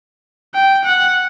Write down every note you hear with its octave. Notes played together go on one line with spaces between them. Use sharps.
G5
F#5